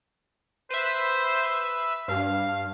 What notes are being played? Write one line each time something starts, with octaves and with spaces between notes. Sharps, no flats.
B4 C5 E5
G2 F5